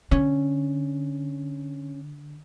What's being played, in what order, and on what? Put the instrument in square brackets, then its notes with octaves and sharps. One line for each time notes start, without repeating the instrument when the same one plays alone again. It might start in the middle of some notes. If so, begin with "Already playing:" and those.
[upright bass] D3 [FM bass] C#4